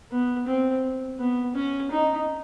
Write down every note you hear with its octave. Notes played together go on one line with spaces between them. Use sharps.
B3
C4
B3
C#4
D#4